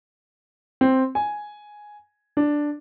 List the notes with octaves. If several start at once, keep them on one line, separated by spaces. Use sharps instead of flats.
C4
G#5
D4